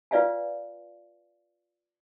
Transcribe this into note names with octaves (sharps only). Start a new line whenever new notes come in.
F4 B4 D5 E5 F5 G#5